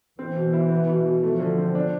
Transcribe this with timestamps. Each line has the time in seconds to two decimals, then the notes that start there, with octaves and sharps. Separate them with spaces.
0.19 E3 C4
0.36 B2
0.53 E4
0.70 B3
0.89 B2
1.06 B2
1.23 F3 A3
1.40 D3
1.58 C4
1.75 D4